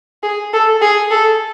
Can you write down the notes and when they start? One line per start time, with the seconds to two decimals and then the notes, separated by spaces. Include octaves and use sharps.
0.23 G#4
0.53 A4
0.82 G#4
1.11 A4